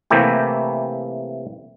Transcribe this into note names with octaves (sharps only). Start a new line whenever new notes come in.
C3 E3 A3 A#3 E4 G4